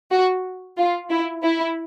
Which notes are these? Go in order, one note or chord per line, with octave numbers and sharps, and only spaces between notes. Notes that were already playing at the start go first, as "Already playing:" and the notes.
F#4
F4
E4
E4